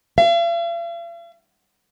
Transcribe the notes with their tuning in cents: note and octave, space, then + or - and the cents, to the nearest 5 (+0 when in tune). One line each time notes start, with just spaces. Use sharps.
F5 -45